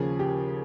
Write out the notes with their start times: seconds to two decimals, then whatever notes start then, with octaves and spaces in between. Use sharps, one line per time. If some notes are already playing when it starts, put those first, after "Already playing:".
Already playing: D#2 C#3 F3 G#4
0.19 G4